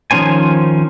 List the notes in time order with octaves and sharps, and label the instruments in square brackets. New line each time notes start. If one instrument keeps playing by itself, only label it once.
[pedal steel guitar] D#3 F3 C#4 C5 G#5